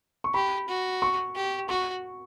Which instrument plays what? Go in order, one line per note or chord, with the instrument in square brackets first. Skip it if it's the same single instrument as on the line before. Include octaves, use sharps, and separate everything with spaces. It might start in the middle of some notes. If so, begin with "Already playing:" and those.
[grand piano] C#6
[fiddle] G4 [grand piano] B5
[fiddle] F#4
[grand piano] C#6
[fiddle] G4
[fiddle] F#4 [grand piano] C#6